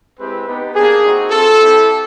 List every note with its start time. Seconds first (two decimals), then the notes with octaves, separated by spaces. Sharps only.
0.18 G#3 C4 E4 G4 B4
0.47 B3 D#4 G4
0.75 A#3 D4 G4 G#4
1.03 C4 D#4 F#4
1.31 C4 F4 A4
1.60 C4 E4 G4